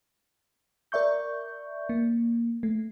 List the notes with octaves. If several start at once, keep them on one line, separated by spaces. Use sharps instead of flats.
A#4 D5 E5 C#6 G6
A#3
A3